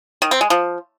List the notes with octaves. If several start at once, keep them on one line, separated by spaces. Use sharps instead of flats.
D#3
C4
G#3
F3